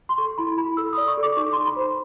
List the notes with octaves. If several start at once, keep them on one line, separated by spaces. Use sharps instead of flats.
C6
A4 C#6
E4 B5
E4 B5
A4 E6
D5 D#6
C#6
A4
D6
D#4 C#6
D#4 C6
B5
C5